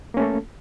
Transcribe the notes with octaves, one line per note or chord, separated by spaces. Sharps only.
A3 A#3 C#4 A4